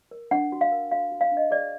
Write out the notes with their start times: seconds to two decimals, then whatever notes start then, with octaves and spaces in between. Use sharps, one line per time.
0.11 A#4
0.31 D4 F#5
0.52 F#4
0.61 F5
0.72 A#4
0.91 F#4 F5
1.11 F#4
1.21 F5
1.31 D4
1.37 D#5
1.51 G#4 D5